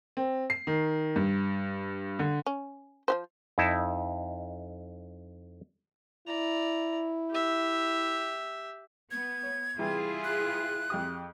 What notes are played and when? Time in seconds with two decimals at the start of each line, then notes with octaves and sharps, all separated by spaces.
0.17 C4
0.50 C7
0.67 D#3
1.16 G2
2.19 D3
2.46 C#4
3.08 F3 G4 C5
3.58 F2 D#4 E4 A5
6.28 E4 D5 A#5
7.30 G4 E5
9.11 B3 G#6
9.43 C#5
9.78 C3 E3 G3 E4 F4 G#4
10.24 F#6
10.90 F2 G4 D#6